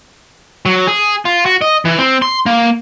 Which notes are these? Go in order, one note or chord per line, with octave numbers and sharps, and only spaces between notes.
F#3
G#4
F4
F#4
D#5
E3
C4
C6
A#3